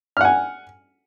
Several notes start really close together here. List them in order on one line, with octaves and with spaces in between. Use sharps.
F6 F#5 G#5